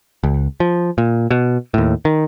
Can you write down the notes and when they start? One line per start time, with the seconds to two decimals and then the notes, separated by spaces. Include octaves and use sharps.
0.23 C#2
0.60 F3
0.98 A#2
1.31 B2
1.74 D#2 A2
2.05 D#3